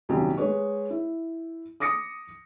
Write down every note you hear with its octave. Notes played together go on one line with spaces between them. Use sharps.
D#1 C2 F#2 D#4 G4
G#3 G#4 B4 C#5
E4
D6 D#6 A#6 C#7